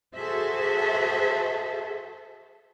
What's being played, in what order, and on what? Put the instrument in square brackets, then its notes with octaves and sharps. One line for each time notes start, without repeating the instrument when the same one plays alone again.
[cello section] F#4 G#4 A4 C5 E5